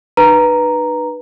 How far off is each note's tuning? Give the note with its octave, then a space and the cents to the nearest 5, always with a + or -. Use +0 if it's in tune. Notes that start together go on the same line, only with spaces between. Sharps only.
D#4 -45 B4 -10 A#5 +0